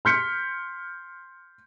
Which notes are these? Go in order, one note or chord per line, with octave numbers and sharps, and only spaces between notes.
C6 F6 G6 B6 C#7